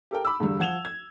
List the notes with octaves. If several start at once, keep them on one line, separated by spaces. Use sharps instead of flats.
G4 A4 A#4 G5
B5 D6 E6
E2 G2 D3 G3
F3 F#5 G#6 E7 F7 G7
G#6